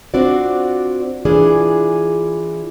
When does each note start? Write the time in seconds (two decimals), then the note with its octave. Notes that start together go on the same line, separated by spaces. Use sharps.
0.14 C4 D4 F4 F#4 D5
1.25 E3 D4 F4 G#4